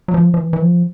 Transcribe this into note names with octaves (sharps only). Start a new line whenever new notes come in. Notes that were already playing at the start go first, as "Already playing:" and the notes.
F#3
F3
F3
E3
E3
F3